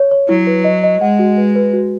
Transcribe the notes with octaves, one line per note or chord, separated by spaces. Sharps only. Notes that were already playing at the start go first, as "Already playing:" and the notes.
Already playing: C#5
C#5
F#3 E4
B4
D#5
D#5
G#3 F#5
F#4
B4
B4
F#4